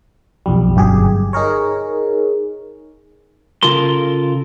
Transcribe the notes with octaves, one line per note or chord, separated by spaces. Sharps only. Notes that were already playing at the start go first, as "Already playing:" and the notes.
B1 F2 G3
G1 F#2 G4 G#4
D#4 G#4 A#4 C#5
C#3 F4 A4 A#4 C6